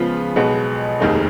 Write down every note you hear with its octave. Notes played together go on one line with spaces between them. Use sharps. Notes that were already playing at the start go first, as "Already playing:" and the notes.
Already playing: C#3 F3 G#3 B3 F4
B1 B2 G#3 B3
F1 D#2 D#3 G#3 D#4